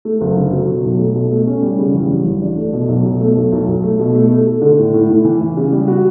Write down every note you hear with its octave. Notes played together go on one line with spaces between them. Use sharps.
A3
F#1
D3
F#3
B2
B1
A3
B2
A3
C#4
G3
C#3
A1
G2
A1
D4
A3
B2
B1
B2
A3
B1
B1
B1
A3
B2
A3
A3
A3
D3
A2
A2
A2
E3
E3
C#3
G3
F#4